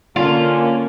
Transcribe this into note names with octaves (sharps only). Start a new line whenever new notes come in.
D3 A#3 C#4 F4